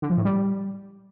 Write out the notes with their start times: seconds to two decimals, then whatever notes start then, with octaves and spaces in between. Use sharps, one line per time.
0.02 D3
0.10 F3
0.17 A2
0.25 G3